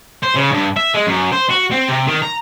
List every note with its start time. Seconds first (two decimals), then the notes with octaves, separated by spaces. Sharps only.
0.23 C5
0.36 C#3
0.52 G2
0.77 E5
0.94 G#3
1.07 F#2
1.32 C5
1.49 F#4
1.71 C4
1.89 C3
2.07 D#3
2.22 A#5